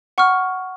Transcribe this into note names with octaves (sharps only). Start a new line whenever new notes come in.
F#5 C#6 F6